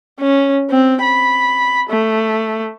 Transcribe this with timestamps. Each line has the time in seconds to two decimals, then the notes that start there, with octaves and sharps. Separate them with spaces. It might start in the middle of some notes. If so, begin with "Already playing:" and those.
0.20 C#4
0.70 C4
1.02 B5
1.89 A3